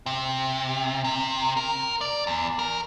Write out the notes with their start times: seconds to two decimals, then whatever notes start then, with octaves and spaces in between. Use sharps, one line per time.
0.06 C3
1.04 C3
1.57 A#4
2.01 D5
2.27 E2
2.59 A#4